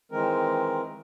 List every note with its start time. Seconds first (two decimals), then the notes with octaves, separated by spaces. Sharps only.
0.12 D#3 E3 G#3 C4 A#4